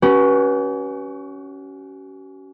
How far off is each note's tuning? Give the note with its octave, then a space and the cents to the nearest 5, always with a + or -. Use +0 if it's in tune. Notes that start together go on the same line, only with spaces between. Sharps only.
C#4 +10 F#4 +45 B4 -25